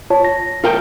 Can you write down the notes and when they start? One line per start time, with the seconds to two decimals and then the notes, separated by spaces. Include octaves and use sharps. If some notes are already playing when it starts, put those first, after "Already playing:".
0.10 F4 C#5 A5
0.25 A#6
0.64 F4 A#4 G5